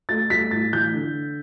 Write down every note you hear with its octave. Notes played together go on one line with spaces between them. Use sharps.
A3 A6
G3 B6
A2 A6
E3 G6
D3